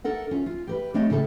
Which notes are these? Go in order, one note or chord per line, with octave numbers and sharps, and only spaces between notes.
D4 A4 A#4 F#5
C#4 F4
F4
G4 A#4 B4
A3 C4 D4 G4 C#5 D#5
A2 C#3 C#4 A4 E5